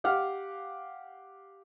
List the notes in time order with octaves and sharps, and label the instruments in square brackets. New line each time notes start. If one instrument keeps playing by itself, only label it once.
[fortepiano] G4 F5 F#5 D6 F6